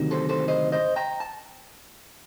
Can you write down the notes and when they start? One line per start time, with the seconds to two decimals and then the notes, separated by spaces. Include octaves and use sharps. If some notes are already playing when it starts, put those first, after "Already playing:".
Already playing: D2 C3 D#3 F#3
0.11 A4 C5
0.29 A4 C5
0.48 C5 D#5
0.72 C5 D#5
0.96 G5 A#5
1.20 A5